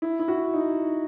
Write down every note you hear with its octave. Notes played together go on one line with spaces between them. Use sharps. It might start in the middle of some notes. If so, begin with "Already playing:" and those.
E4
E4
F#4
D#4